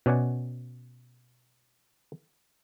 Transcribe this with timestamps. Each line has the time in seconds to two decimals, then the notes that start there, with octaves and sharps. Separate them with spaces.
0.06 B2 C#4 D5 F#5 G#5